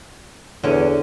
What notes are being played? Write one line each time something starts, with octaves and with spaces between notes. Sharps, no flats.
E2 D3 C#4